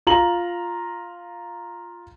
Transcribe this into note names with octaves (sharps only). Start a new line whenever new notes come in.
F4 A#5 F#7